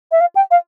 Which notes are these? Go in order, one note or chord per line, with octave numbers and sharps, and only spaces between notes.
E5
F5
G5
F5